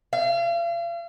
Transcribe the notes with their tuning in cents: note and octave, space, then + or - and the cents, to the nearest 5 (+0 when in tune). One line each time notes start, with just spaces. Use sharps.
F5 -40